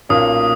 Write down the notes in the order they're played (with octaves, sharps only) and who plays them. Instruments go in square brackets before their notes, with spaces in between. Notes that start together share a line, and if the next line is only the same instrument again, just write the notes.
[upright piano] B1 A#2 A#3 C#4 [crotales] D#6